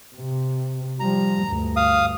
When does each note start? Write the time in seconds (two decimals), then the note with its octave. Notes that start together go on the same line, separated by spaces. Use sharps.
0.16 C3
1.00 F3 G3 A#5
1.46 D2 G2
1.76 F5 D#6